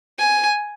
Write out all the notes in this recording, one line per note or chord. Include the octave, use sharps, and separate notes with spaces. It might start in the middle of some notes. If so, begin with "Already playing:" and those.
G#5